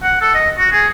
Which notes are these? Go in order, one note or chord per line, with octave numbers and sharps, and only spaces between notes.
F#5
A4
D#5
F#4
G#4